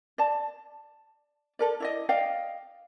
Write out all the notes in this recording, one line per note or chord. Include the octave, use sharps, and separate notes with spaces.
D5 A5
A4 A#4 D5
E4 D5 D#5
D5 D#5 F5 G5